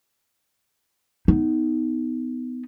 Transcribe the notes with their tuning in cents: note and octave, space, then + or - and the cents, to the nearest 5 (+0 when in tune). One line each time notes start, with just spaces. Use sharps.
B3 +20 D#4 +10